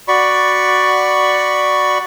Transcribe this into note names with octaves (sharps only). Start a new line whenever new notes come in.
F#4 D5 B5 C#6